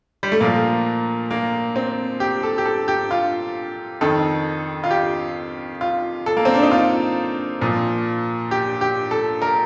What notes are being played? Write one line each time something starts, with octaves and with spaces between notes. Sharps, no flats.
G3
A3
A#2 F3 A#3
A#3
C4
G4
A4
G4
A4
G4
F4
F2 D#3 A4
F4
G4
F4
A4
A#3
C4
D4
D#4
F4
A#2 F3
G4
G4
A4
A#4